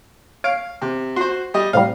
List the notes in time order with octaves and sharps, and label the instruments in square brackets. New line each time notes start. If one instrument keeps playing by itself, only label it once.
[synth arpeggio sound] C#5 D7 [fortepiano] F5
[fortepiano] C3
[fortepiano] F#4 C5 [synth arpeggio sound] C6
[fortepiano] G3 D#5
[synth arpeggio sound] A2 C3 G3 [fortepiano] F5